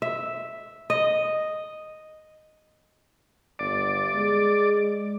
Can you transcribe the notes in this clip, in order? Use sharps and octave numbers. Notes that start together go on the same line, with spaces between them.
E5
D#5
G1 D5
G#3